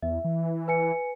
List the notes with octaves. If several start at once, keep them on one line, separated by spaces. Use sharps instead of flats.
E2 E5
E3
B4 G#5 C#7